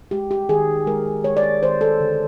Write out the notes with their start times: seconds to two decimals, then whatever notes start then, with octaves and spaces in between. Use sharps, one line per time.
0.11 G#3 G4
0.31 G4
0.49 D#3 G#4
0.87 G#3 A#4
1.24 G#3 C#5
1.37 D5
1.43 C#5
1.63 D#3 C5
1.81 A4
2.00 D3